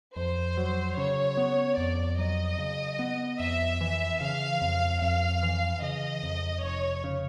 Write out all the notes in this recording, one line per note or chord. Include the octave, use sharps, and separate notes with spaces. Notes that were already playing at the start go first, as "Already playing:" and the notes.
F2 C5
F#3
C#3 C#5
B3
F2 D5
F#3 D#5
C#3
B3
F2 E5
E3
C#3 F5
F2
F2 F5
E3
C#3 D#5
F2
F1 C#5
C#3